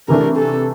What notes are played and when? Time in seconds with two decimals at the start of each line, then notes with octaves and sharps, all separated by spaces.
0.08 C3 E3 A3 D4 A#4
0.37 A4